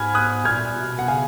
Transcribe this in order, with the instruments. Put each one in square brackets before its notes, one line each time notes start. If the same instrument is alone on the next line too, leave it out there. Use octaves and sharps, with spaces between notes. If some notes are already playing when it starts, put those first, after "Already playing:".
Already playing: [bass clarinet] G#2 [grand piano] G#5 B5 F6 G#6
[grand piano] D#6 F#6
[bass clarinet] A#2 [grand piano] F6 G#6
[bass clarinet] B2
[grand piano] F#5
[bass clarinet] C#3 [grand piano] F5 G#5